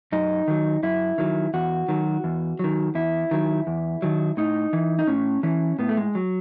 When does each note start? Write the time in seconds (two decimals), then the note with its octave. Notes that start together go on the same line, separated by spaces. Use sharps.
0.12 F#2 D#4
0.48 D#3 F#3
0.83 F#2 E4
1.18 D#3 F#3
1.54 E2 F#4
1.88 D#3 F#3
2.24 E2
2.59 D#3 F#3
2.95 E2 E4
3.31 D#3 F#3
3.67 E2
4.02 D#3 F#3
4.37 A2 D#4
4.73 E3
4.99 D#4
5.07 A2 C#4
5.43 E3 C#4
5.79 A2 B3
5.89 A3
5.97 G#3
6.15 F#3